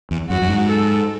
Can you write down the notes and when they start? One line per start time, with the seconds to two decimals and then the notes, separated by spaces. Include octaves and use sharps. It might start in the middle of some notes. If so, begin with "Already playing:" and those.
0.11 E2
0.30 F#2 F#4
0.42 F#2
0.49 G#2
0.67 A4